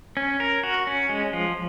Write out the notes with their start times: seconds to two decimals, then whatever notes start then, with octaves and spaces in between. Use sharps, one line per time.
0.17 C#4
0.40 A#4
0.63 F#4
0.87 C#4
1.09 G#3
1.33 F3